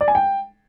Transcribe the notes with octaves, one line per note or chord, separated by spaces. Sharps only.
D5
G#5
G5